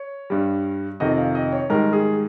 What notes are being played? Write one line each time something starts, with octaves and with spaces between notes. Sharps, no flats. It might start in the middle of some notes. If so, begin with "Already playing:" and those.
Already playing: C#5
G2 G3
F2 C3 D#3 D#5
F5
D#5
C#5
G#2 D#3 G3 A#4
G#4